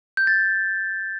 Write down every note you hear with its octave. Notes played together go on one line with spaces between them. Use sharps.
G6
A6